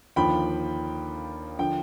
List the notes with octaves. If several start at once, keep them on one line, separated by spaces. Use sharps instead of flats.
D#2 D3 F3 G5 B5
D3 F3 G5